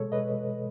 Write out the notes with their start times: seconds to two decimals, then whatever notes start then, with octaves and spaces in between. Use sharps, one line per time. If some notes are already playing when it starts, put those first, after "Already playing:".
Already playing: B2 G#3 G#4 A4 C#5
0.12 B4 D#5